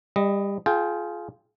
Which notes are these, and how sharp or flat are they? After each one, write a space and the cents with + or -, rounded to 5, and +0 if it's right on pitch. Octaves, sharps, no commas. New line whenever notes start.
G3 +25 D#5 +0
F4 -5 G#4 +30 G5 +0